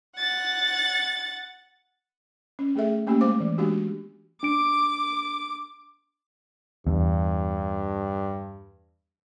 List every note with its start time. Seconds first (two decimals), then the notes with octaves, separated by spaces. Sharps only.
0.18 F#5 A6
2.59 C#4
2.76 A3 G#4 A4 E5
3.07 A3 A#3 C#4 G4
3.21 G#3 C5 F5 D6
3.40 E3
3.58 G#3 B3 D4 F#4 G4
4.43 D4 D6 D7
6.87 E2 G2